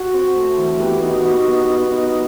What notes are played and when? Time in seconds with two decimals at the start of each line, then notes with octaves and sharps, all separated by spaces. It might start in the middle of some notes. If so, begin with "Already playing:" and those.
Already playing: F#4
0.14 C4
0.36 A3
0.58 E3
0.80 B3 G4
1.02 D#4
1.14 F#4
1.25 D#4
1.48 B3
1.70 B3
1.92 D#4